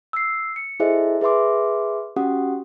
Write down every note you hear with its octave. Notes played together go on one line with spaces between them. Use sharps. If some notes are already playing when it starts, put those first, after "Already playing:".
E6 C7
C#7
E4 G#4 A4 C5 D#5 E5
G#4 B4 E5 C6 D6
C#4 F#4 G4 F#5 D#6